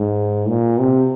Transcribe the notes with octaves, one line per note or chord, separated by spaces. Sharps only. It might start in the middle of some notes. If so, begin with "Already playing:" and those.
Already playing: G#2
A#2
C3